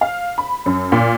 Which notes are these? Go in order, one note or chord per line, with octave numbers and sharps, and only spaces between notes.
F5
B5
F#2
A#2